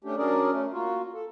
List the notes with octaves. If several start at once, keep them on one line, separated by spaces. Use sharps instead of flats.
A3 C#4 D4 G4
F#3 C#4 D4 G#4 A#4 D5
A3 C#4
A#3 F4 F#4
A4